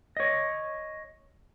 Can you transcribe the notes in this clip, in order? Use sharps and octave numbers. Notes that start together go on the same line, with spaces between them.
C#5 D#5